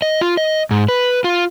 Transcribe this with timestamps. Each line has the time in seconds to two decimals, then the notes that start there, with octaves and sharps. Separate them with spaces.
0.02 D#5
0.21 F4
0.37 D#5
0.71 G#2
0.89 B4
1.24 F4